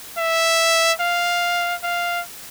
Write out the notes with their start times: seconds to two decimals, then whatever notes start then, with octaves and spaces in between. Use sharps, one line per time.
0.18 E5
1.00 F5
1.83 F5